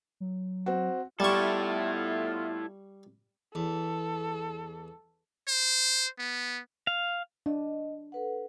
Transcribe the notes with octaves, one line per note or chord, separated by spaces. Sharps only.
F#3
C4 F#4
G3 A3 B3 E4 F4 A4 C#6
E2 A4
C5
B3
F5
D4 D#5
A4 B4 F#5